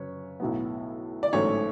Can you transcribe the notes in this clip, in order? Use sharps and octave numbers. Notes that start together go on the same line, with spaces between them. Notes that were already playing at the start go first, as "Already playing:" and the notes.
Already playing: F#2 C#3 B4 C#5
B1 A2 F#3 B3
D5
A1 G#2 F#3 A3 C#5